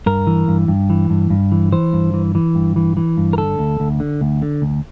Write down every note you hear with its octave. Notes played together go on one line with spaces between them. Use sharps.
G2 A#4
E3
G2
G2
E3
G2
G2
E3
E3 C5
G2
E3
E3
G2
E3
E3
G2
A#4
D3 A4
D2
D2
D3
D2
D3
D2